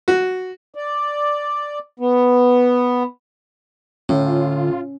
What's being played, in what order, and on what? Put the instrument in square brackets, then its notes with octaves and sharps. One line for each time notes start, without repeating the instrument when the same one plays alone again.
[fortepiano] F#4
[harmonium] D5
B3
[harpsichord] A2 [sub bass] D3 [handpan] C#4 [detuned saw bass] F4